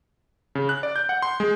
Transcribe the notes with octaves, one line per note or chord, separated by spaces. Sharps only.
C#3
F#6
D5
G6
F#5
C6
G#3